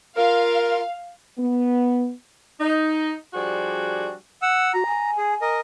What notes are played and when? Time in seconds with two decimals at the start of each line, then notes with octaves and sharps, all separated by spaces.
0.17 F4 A#4 F5
1.38 B3
2.61 D#4
3.34 F3 G3 D4 F#4 G#4
4.42 F#5 E6
4.74 F#4 A#5
4.86 G#5
5.18 G#4
5.42 A#4 D#5